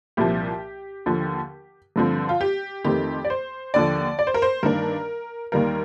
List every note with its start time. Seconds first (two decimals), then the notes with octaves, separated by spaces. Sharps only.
0.17 C2 A#2 F3 G4
1.06 D#2 D3 F3
1.96 G2 D3 F3 C4
2.29 F4
2.41 G4
2.84 F2 D#3 A3 C4 G4
3.25 D5
3.30 C5
3.74 D#2 D3 F3 D5
4.19 D5
4.27 C5
4.34 A#4
4.42 C5
4.63 G2 D#3 A#3 D4 A#4
5.52 D#2 D#3 G3 A#3 A#4